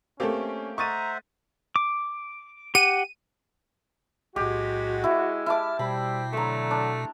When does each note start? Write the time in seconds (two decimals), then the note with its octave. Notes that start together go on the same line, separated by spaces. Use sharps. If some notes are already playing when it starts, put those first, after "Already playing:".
0.20 A3 A#3 C4 C#4 G4 D5
0.78 C5 D#5 E5 F#5 A#5 C#6 A6 D#7
1.76 D6
2.75 G4 F#5 D#7
4.36 B1 A2 G#3 F#4 G4
5.04 E4
5.46 E4 A5 D6 F6
5.79 B2 G3 C5 G5 B5
6.33 D3 F#3 A3 A#5 C6
6.71 D4